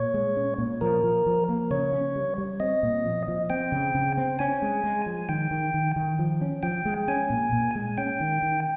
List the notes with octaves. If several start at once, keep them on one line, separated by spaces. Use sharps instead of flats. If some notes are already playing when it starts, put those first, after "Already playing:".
Already playing: A#2 C#5
G#3
C#4
A#2
F3 A#4
F3
F3
A#3
C#3 C#5
C#4
G3
G3
C4 D#5
A#2
F3
F3
C4 G5
C#3
C#3
C4
C#4 G#5
G#3
G#3
F3
D#3 G5
D#3
D#3
D#3
F3
C#4
F3 G5
G#3
C#4 G#5
A#2
A#2
G#3
C#4 G5
D#3
D#3